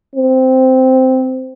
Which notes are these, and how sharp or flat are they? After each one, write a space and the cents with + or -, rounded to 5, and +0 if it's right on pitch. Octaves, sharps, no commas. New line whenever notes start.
C4 -10